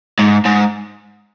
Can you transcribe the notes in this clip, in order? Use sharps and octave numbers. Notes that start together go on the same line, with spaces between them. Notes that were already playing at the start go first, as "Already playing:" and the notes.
G#2
G#2